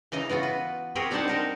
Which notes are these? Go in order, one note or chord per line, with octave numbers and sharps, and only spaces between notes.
C#3 E3 D#5 A#5
E3 B3 F4 F#4
B4
C4 G4 G#4 A#4 C#5
G3 C4 D4 D#4 C5 F#5
D#4 A#4 C5